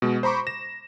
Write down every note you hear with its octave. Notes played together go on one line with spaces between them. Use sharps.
B2 G#3
C5 A#5 B5 C#6 D6
A#6 E7